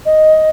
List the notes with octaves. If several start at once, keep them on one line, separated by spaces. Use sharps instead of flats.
D#5